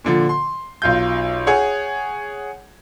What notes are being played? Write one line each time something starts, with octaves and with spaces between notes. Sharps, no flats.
A#2 D3 F3
C6
B1 F4 G6
G#4 C#5 F#5